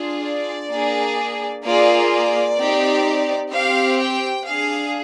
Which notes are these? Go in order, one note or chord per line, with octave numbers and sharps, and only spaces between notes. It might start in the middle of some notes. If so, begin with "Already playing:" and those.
Already playing: D4 F4 G#4
D5
A#3 D4 G#4
A#3 F4 G#4 D5
D5
C4 D#4 G4
C4 G4 F5
G5
D4 G#4 F5